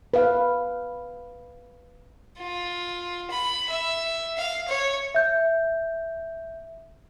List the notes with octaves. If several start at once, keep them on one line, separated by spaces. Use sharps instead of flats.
B4 F5
F4
B5
E5
F5
C#5
E5 G6